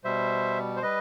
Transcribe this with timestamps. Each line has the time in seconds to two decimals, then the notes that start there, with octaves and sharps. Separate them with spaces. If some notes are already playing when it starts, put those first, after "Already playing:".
0.04 B2 G3 C5 E5
0.77 C5
0.82 G3 B4 D#5